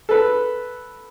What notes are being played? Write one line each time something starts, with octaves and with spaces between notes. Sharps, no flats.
A4 B4